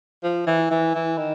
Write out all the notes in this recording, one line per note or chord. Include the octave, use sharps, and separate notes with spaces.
F3
E3
E3
E3
D#3